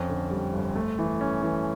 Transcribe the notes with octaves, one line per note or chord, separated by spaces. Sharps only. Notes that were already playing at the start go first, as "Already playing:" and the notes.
Already playing: F2 C#4
D3
G3
G1
A3
E3
C#4
E3